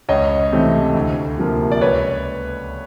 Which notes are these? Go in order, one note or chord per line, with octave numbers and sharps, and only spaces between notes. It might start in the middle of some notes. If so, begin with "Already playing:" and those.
C#2 C#5 D#5
C3 E3 A3 C4
D2
C3 F3 A#3
D5
C#2 B4 C#5